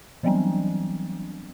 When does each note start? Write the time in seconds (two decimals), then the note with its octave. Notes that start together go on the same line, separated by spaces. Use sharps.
0.23 E3 F#3 G3 B3 C4 D4